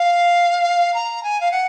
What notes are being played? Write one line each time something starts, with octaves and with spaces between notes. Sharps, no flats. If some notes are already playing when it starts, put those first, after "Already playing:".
Already playing: F5
A#5
G#5
F5
F#5